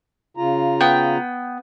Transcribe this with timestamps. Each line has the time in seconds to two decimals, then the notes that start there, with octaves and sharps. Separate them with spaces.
0.37 C#3 F4 A#5
0.81 B3 G5